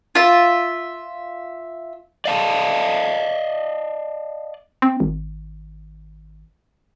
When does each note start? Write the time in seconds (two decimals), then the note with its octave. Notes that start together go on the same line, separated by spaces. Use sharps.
0.15 F4 E5
2.25 D5 D#5 F5 G5 A5
4.82 C4
5.00 G#1